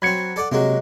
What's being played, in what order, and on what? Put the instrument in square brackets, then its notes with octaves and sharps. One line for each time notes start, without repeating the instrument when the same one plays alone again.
[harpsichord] F#3 C4 [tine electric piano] B5 G#6 C#7
[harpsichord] A4 D5 F#5
[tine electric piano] C3 [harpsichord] F#3 G#3 A#3